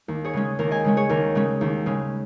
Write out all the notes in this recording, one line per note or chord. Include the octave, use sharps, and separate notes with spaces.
D#2
G#4 C#5
C#3 G#3 C#4
D#2 A#4
D#5 G#5
C#3 G#3 C#4
G#4 C#5
D#2 A#4
C#3 G#3 C#4
D#2
C#3 G#3 C#4